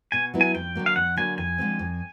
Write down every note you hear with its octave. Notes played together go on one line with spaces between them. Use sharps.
B2 G#5
F#3 B3 E4
G#5
F2 G5
D3 F#3 A#3
F5
F2 F#5
D3 F#3 A#3 G#5
F2 G#5
D3 F3 G#3 C4
F2